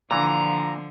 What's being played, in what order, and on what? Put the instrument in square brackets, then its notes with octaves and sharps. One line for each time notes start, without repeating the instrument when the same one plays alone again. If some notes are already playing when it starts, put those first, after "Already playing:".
[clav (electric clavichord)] A#2 E3 [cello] D3 F3 [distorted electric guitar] A#5